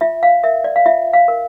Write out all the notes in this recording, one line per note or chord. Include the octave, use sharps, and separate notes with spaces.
F4 E5
F5
A#4 E5
D5
F5
F4 E5
F5
A#4